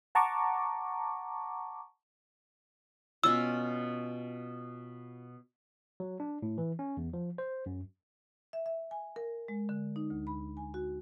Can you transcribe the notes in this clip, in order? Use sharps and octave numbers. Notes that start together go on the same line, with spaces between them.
F#5 A5 A#5 C#6 D6
B2 C#4 F4 E6
F#3
D4
A2
E3
C#4
E2
F3
C5
F#2
E5
E5
G#5
A#4
G#3
D3
D#4
D2
B5
G#5
F#4